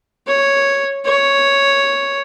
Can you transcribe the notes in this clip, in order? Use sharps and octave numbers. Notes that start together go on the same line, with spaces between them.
C#5
C#5